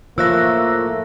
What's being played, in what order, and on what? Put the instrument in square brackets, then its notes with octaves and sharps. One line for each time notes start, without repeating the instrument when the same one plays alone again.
[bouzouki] A2 A3 C#5 [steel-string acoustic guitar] F3 [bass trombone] A#3 [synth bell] E6 F#6 A#6